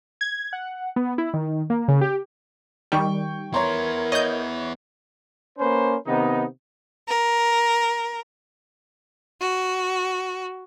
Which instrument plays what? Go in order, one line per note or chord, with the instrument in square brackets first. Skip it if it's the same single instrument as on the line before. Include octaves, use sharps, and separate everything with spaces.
[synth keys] G#6
F#5
B3
E4
D#3
A#3
C#3
G4
[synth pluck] D#3 G3 [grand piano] G5 C#6
[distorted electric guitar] B3 E4 [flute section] A#4 G#6 [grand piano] C#5 A#5 C6
[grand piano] C#5 [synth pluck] D#5 G6
[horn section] A#3 C#4 B4 C5
C3 D#3 B3 D#4
[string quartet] A#4
F#4